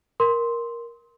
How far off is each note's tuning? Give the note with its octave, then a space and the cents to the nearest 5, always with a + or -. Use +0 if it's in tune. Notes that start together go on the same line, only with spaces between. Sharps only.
A#4 +10 C6 +0